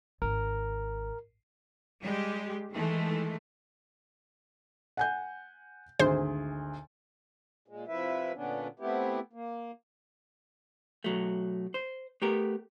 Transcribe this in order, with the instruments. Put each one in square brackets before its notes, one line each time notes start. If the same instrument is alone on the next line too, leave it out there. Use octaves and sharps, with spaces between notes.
[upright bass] G#1 [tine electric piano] A#4
[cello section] G3 G#3 G4
D#3 E3 G#3 A3
[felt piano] F#5 G#5 G6
[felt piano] G#1 D2 G#4 [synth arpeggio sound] C5
[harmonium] A#2 G#3
C3 F3 E4 B4 E5
A#2 D3 B3 C#4 D4
A3 B3 C4 E4 G4
A#3
[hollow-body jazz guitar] B2 F#3 A3
C5
A3 B3 G4 A#4